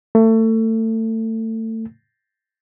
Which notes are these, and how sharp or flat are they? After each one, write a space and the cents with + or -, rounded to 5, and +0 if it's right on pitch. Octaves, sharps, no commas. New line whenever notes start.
A3 +25